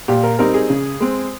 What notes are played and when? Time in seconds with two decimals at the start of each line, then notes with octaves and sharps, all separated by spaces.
0.08 A#2 G4
0.24 A#4
0.39 G3 C4 D#4 A#4
0.54 G#4
0.70 C#3
1.00 G#3 C4